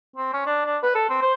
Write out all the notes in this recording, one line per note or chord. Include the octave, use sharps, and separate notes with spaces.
C4
C#4
D4
D4
B4
A4
C4
C5